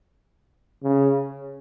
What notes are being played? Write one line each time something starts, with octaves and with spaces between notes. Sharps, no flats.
C#3